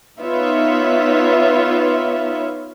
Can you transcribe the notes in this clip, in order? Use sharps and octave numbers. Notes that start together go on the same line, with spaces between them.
B3 D#4 F4 B4 C#5 E5